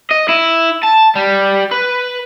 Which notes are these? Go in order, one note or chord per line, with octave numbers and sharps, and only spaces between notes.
D#5
E4
A5
G3
B4